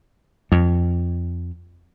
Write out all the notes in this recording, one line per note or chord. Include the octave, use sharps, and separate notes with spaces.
F2